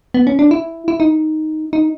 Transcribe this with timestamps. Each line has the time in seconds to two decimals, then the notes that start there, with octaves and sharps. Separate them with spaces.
0.14 B3
0.27 C#4
0.39 D4
0.51 E4
0.88 E4
1.00 D#4
1.73 D#4